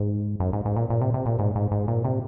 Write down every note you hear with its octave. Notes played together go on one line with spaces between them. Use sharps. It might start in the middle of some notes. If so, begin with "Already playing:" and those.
Already playing: G#2
F#2
G#2
G#2
A#2
A#2
C3
C3
A#2
G#2
G#2
G#2
A#2
C3